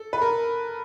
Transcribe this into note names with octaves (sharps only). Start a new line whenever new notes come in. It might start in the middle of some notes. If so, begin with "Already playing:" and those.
Already playing: A4
B4
A#4